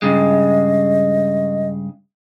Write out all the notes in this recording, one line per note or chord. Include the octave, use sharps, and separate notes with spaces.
G2 C#3 G#3 D#5